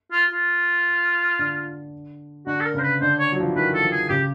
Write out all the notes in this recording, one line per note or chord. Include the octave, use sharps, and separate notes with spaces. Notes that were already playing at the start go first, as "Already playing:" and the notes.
F4
F4
D3
D3 F#4
A4
A#4
C#3 C5
B4
D3 C5
C#5
F#3
F3
E3
D#3 B4
A4
F3
G#4
C#3 G4